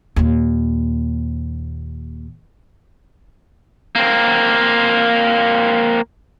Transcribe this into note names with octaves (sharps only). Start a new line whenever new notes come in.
D#2 A#2
A#3 C4